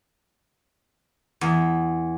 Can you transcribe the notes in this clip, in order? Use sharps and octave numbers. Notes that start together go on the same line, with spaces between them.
E2